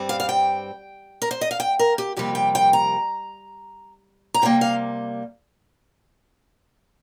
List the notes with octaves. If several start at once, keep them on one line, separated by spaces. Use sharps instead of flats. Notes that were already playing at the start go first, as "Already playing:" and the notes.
Already playing: G2 G3 C4
F5
F5
G5
A#4
C5
D#5
F5
G5
A#4
G4
F2 C3 G3 A#3 G4
G5
G5
A#5
A#5
C3 G3 A#3 G5
F5